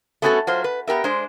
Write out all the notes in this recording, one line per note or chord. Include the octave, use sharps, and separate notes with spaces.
A3 B3 C#4 F#4 G4 A4
F#3 F4 C5
B4
B3 G4 A#4 E5
G#3 D4 C5